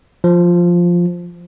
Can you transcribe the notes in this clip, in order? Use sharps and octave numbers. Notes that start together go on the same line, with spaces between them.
F3